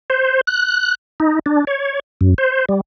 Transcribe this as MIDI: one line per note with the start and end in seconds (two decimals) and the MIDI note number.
0.10 0.41 72
0.47 0.95 90
1.20 1.39 63
1.46 1.64 62
1.67 1.99 73
2.21 2.34 42
2.38 2.65 72
2.69 2.81 55